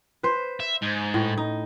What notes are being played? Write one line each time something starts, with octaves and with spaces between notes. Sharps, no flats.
B4 C5
E5
G#2
A2
D#4